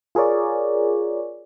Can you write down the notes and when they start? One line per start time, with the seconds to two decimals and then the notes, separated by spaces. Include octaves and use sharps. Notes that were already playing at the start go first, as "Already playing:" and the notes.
0.15 F4 G#4 A#4 C#5 D5